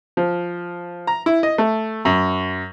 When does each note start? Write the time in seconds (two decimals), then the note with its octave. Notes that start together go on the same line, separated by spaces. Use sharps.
0.17 F3
1.07 A#5
1.26 E4
1.43 D#5
1.58 A3
2.05 F#2